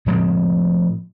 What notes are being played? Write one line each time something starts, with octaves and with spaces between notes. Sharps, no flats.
A2 F3 G#3 C4